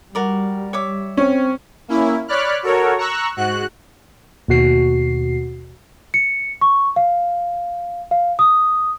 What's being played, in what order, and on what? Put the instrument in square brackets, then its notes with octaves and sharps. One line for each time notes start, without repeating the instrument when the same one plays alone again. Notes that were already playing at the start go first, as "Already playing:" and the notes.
[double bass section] G3 [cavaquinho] F#4 A#4 D5
[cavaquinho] C#5 E5 D6
[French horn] C4 [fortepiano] C#4
[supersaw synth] A#3 C#4 E4
C#5 D5 B5 F6 F#6
F#4 A4 A#4 C#5
A#5 C#6 E6 F#6
G#2 F#4 F#6
[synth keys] D#2 B2 F#4 C7
[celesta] C#7
C#6
F5
F5
D#6